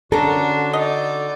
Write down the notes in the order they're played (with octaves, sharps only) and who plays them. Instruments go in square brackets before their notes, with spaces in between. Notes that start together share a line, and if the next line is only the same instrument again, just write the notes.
[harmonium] D3 F#4 [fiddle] C#4 D4 [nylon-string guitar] A4 [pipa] A#4 A#5
[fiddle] D#4 D5 [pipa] D#5